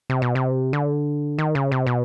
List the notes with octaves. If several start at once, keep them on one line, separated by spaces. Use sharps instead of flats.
C3
B2
C3
D3
D#3
C#3
C3
B2